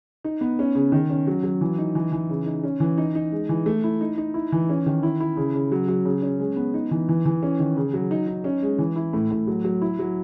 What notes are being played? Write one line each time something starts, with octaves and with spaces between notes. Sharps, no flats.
D#4
B3
C#4
C#3
D#3
C#4
F#3
F#3
E3
D#4
E3
E3
C#3
D#4
C#4
E3
D#4
D#4
G#3
E3
A3
E4
D#4
D#4
E4
E3
C#4
D#3
E4
E4
C#3
C#3
F#3
F#3
C#3
C#4
G#3
B3
D#4
E3
E3
E3
C#4
D#3
C#3
F#3
D#4
D#4
C#4
G#3
E3
E4
A2
A2
F#3
F#3
E4
F#3